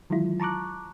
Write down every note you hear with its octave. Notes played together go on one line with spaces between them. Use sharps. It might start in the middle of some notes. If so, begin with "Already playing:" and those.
D#3 E3 F#3 G#3 E4 F4
A5 A#5 C#6 D6 F#6